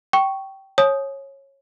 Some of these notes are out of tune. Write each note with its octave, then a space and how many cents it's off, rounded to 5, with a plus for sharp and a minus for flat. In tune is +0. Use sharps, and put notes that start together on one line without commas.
G5 -15 C#6 +0
C#5 -20 G#5 +40 D#6 +0